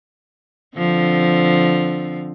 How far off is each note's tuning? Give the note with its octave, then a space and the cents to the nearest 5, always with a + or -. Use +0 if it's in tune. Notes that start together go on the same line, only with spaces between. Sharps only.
D3 +0 F3 +0 C4 +0